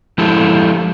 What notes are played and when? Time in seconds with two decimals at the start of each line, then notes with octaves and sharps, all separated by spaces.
0.18 F3 G#3 E4 G4 A4